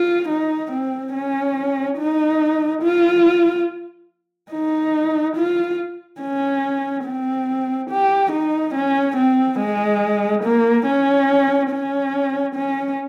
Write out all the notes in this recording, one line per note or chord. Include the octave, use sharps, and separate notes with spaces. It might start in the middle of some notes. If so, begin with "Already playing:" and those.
Already playing: F4
D#4
C4
C#4
D#4
F4
D#4
F4
C#4
C4
G4
D#4
C#4
C4
G#3
A#3
C#4
C#4
C#4